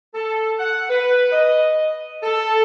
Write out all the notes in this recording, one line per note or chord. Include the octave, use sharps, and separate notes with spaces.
A4
F#5
B4
D#5
A4